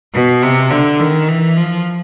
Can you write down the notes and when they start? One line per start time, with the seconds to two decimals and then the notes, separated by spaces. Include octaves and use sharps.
0.14 B2
0.43 C3
0.70 D3
1.00 D#3
1.28 E3
1.57 F3